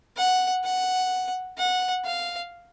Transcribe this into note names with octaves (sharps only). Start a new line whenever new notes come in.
F#5
F#5
F#5
F5